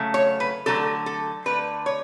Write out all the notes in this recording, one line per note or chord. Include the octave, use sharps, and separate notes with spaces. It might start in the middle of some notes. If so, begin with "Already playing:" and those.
Already playing: C#3 F#3 A3
C#5
B4
D3 F#3 A3 A4
A4
D3 A3 B4
C#5